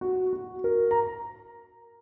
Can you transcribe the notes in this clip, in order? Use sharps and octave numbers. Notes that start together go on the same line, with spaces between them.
F#4
F#4
A#4
A#5